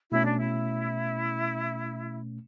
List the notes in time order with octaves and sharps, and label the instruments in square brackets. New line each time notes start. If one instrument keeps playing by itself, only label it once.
[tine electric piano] B2 A3 C#4 [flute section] E4
[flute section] D4
E4